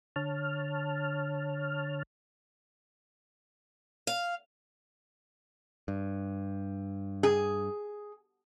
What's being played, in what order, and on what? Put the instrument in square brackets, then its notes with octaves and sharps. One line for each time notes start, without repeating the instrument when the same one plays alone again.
[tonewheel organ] D3 C#5 A5 F6
[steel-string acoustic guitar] F5
[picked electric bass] G2
[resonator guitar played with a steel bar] G#4